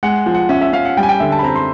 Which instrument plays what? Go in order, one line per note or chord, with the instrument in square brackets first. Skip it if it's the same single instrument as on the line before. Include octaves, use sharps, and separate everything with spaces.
[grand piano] G#3 F#5
F3
F#5
C#4 E5
E5
C#4 F5
F#5
G3 G5
G#5
G5
D3 E5
A5
B5
C4 A#5
C6